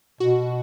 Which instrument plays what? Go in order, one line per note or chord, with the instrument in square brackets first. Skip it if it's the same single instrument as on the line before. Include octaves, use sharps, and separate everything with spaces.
[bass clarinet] B2 [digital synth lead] F#4